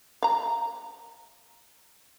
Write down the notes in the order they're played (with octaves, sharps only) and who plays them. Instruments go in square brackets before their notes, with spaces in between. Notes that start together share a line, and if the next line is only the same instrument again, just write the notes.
[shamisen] F5 A#5